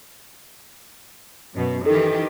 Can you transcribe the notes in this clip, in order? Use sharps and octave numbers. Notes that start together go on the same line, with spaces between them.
F#2 B2
D#3 E3 G4 A4